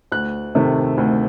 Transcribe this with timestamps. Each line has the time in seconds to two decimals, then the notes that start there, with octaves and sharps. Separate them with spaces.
0.12 D2 F#6
0.55 C3 D#3 A3
0.98 D2